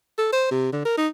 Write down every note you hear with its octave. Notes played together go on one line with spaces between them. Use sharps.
A4
C5
C3
D3
A#4
D#4